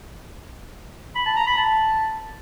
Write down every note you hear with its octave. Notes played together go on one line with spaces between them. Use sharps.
B5
A5
A#5
B5
A5